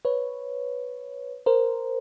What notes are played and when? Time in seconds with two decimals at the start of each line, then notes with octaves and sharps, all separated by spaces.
0.05 B4 C#5
1.46 A#4 C5